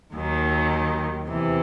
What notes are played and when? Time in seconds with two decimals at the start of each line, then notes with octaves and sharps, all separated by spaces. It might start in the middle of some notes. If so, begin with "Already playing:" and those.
0.13 D#2 D#3 F#3
1.29 E2 C3 E3